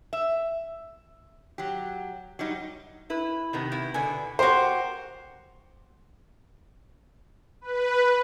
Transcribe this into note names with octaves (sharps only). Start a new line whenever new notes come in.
E5
F#3 G4
F#3 G3 D#4
E4 B4
C3 D#3 B3
E4
B2 D3 B3 G#5
F#4 G4 A#4 C5
B4